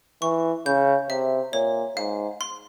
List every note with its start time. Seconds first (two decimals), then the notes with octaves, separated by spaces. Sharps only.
0.22 E3 C#6
0.66 C#3 G6
1.10 C3 E5
1.53 A#2 C#5
1.97 G#2 F5
2.41 C6